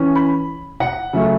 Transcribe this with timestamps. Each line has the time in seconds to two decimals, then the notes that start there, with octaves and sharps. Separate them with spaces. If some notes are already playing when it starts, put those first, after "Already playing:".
Already playing: E3 C#4
0.15 B5
0.80 F#5
1.13 C#3 F#3 A3 C#4 E5